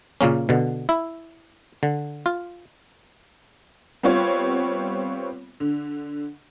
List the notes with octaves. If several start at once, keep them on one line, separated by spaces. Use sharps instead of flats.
A#2 C#3 A#3 C#4
B2 D3
E4
D3
F4
G3 B3 C4 F4 C#5
D3